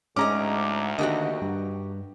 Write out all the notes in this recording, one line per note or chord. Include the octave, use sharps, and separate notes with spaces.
D2 G#2 C#4 G#4 D#5 A#5 D6
D3 D#3 A#3 F#4 G4 D#5
G2